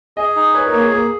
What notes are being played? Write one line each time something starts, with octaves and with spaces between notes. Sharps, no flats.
G#4 D#5
D#4
B4 C#5
A#4
A#3
G#4
A#3 G#4